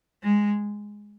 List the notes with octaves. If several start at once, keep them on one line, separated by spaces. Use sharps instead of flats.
G#3